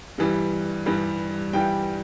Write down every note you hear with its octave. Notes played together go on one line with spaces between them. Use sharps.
G2 E3 G3
G2 E3 G3
G2 E3 G3 G5